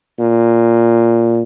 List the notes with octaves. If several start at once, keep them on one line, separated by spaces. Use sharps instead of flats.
A#2